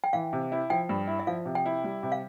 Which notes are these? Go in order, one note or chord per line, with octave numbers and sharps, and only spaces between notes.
G5
E3 F5
C3
E4
F3 G5
G2
E4
E5
F3 F5
C3
G5
E4
G3
C3
F5